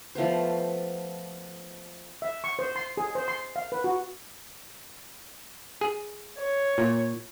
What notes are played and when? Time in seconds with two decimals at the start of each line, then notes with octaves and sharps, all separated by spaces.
0.15 F3 A3 B3 C5
2.22 E5
2.44 C#6
2.59 C5
2.76 C6
2.97 G#4
3.15 C5
3.28 C6
3.56 F5
3.72 B4
3.84 F#4
5.81 G#4
6.39 C#5
6.78 A#2